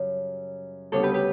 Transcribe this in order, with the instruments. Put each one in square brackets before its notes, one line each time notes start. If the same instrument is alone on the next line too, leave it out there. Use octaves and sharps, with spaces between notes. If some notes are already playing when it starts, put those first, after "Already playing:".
Already playing: [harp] F#2 C#3 G3 C#4 C#5
D2 C#3 G3 B3 D4 A4 C#5
G4 B4
G4 B4